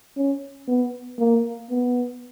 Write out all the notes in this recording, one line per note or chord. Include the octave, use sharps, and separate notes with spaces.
C#4
B3
A#3
B3